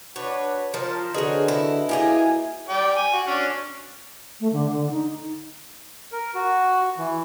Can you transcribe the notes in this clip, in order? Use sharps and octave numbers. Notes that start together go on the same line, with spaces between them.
D4 F#4 B4 C#5
F3 A#4 C5 A5
D3 F#4 G#4 B4 C#5 D#5
E4
A#3 E4 G4 G#4 G#5
D5 G5
G#5
F#4
C#4 D4
A3
D3
D3
D#4
A#4
F#4
E3